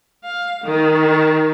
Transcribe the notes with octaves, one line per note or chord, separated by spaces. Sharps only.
F5
D#3